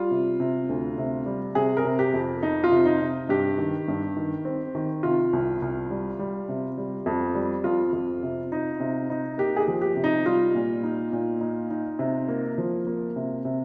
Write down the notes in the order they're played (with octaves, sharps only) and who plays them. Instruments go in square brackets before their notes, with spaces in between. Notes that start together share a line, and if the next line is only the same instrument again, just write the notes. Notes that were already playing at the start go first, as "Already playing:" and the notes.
Already playing: [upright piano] G3 F4
C3
C3
D2
C3
G3
C3 G#4
A#4
C3
G4
F2
F2 D#4
F4
C3
D#4
C3
G2 G4
D#3
G2
D#3
C4
D#3
C3 F4
C2
C2
G3
G3
C3
G3
F2
G3
F2 F4
F2
C3
D#4
C3
D#4
A#3 G4
G#4
G4
F3
G4
C3
D#4
G3 F4
A#2
D#4
A#2
D#4
D#4
C3
A#3
F3
A#3
C3
C3